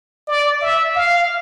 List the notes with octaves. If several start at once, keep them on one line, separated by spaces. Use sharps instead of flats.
D5
E5
F5